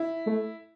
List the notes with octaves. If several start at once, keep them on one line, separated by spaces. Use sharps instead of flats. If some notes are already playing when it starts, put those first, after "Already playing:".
Already playing: E4
A3